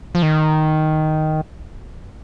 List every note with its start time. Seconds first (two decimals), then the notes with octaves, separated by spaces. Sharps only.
0.15 F3
0.23 D#3